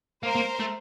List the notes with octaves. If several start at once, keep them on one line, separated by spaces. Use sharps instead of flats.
A#3 A#4 C5
A#3
A3